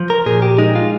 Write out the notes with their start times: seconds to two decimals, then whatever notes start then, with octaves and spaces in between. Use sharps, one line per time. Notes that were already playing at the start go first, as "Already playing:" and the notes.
Already playing: F3
0.10 A#4
0.26 A#2 G#4
0.42 G4
0.58 G#3 D#4
0.75 F4